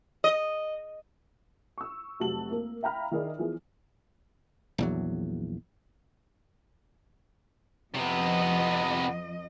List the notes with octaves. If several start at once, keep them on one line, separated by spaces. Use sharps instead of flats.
D#5
C#6 E6
F1 C3 F#3 F#4 A5 F#7
A#3 A#4
E5 F5 G5 A#5 B5 F6
D#3 D#4 E4 G#4 A#4 D5
E3 F3 B3 G#4
A#1 E2 F#3
F2 C3 F3 B3 D#5